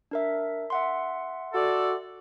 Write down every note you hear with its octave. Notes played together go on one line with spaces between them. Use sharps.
D4 A#4 E5
E5 F#5 C6
F#4 A4 D5